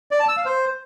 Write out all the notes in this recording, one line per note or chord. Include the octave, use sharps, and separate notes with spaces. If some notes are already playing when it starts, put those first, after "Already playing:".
D5
A5
E6
F5
C5